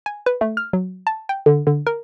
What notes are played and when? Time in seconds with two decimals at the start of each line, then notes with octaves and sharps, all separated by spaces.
0.06 G#5
0.26 B4
0.41 A3
0.57 F6
0.73 F#3
1.07 A5
1.29 G5
1.46 D3
1.67 D3
1.87 A#4